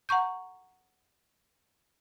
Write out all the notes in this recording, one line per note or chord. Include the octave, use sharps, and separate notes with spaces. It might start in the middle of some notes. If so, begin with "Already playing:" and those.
F#5 A#5 C#6 G6